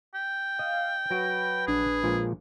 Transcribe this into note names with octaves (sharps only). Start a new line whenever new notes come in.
G5
D#5 F5
F#3 F#4 B4 A#6 D7
A#1 D4 G#4
A#2 F3 G#3